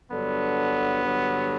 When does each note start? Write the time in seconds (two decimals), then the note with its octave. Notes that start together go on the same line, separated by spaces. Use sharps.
0.11 G2 D3 F#3 B3
1.04 G2 D3 F#3